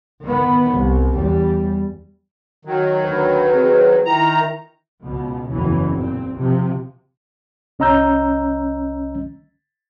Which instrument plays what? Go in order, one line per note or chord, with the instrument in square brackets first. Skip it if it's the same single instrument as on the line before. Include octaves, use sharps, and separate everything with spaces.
[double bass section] D#3 B3
C2
E2 G3
[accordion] D#3 F#3
[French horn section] D2 B4
C4 G#4 B4
[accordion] D#3 A#5 [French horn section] E4
[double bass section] C#2 B2
F#1 E2 E3 C#4
A#2 C4
C3 F3
[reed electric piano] C2 C#4 D#5 A#5 E6 G6